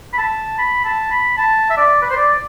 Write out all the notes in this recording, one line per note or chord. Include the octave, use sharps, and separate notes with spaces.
B5
A5
B5
A5
B5
A5
E5
D5
B4
C5
D5